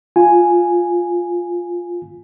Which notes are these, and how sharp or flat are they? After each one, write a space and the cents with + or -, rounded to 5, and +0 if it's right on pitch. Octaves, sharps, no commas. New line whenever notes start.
F4 +5 G#5 +0